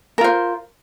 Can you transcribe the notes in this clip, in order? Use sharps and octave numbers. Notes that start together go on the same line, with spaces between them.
F4 A#4 C5